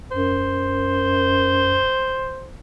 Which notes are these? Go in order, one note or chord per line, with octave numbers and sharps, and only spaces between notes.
F#2 C5